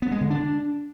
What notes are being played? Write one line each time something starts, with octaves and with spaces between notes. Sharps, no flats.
B3
G#3
D3
D4